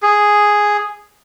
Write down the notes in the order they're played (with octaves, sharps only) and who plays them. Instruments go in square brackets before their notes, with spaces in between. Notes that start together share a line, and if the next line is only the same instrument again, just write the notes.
[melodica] G#4